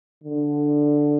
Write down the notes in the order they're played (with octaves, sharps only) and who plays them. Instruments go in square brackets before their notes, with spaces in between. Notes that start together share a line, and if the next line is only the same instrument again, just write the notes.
[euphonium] D3